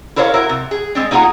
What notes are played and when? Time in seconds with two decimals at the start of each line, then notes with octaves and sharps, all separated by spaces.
0.16 E4 A#4 C5 C#5 D#5 F5
0.34 E4 F#4 A#4
0.49 C3
0.71 G#4
0.95 G#3 C4 D4
1.11 A#3 D#4 F4 G#4 F#5 A#5